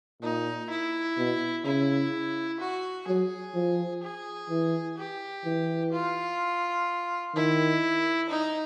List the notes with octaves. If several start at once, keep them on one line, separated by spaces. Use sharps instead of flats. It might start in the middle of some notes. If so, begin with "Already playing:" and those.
A#2 D#4
E4
B2
C#3 E4
F#4
F#3 G#4
F3
G#4
E3
G4
E3
F4
D#3 E4
D#4